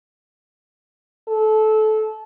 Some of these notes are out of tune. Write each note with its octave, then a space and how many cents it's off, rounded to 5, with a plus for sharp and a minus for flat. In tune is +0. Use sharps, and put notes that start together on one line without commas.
A4 -25